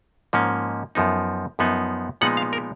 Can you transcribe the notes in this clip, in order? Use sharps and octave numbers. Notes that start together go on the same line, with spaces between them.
G#2 F3 A#3 C#4
F#2 F3 B3 D#4
F#2 F3 B3 D#4
A#2 F3 G#3 B3 D#4 F#5
F5
A#4